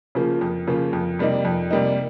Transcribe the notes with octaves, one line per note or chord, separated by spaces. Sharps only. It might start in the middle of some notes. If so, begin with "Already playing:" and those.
C#3 F3 A#3 F4
F2
C#3 F3 A#3 F4
F2
C3 G3 A#3 D#4
F2
C3 G3 A#3 D#4